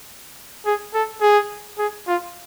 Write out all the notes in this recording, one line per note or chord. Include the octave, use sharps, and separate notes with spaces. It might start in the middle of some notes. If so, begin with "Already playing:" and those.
G#4
A4
G#4
G#4
F4